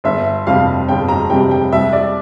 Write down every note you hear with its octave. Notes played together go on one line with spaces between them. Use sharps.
G1 E5
F2 C3 G3 C4 F5
G1 G5
A#5
F2 C3 G3 C4 G5
G5
C2 E5
D5